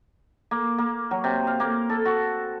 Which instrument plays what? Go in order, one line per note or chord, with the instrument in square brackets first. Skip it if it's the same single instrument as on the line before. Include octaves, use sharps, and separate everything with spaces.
[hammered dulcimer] A#3
A#3
F#3
C3
F5
A#3
A4
F#4